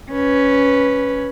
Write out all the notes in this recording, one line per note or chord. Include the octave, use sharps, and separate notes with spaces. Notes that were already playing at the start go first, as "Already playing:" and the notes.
C#4 B4